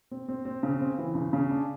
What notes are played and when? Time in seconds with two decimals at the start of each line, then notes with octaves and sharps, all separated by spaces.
0.11 C4
0.28 C4
0.45 C4
0.63 C#3
0.81 C4
0.98 E3
1.15 C#3
1.33 C#3
1.51 D4